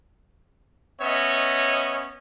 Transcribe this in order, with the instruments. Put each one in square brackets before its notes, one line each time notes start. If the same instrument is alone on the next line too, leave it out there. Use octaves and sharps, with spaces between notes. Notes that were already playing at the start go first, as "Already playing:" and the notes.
[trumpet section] B3 C#4 C#5 D#5 E5